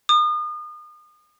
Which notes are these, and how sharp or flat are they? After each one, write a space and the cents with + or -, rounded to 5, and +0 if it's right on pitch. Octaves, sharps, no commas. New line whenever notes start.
D#6 -35